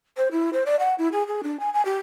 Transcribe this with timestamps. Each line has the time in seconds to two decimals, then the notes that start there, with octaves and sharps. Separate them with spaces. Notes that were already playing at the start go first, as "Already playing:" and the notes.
0.17 C5
0.31 E4
0.53 C5
0.66 D5
0.79 F#5
0.98 E4
1.12 G#4
1.27 G#4
1.43 D4
1.59 G#5
1.73 G#5
1.85 G4